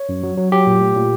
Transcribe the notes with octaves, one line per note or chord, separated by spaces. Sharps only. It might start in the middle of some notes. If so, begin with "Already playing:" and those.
Already playing: C#5
F#2
F#3
F#3
F#3 G4
A#2
A3
A#2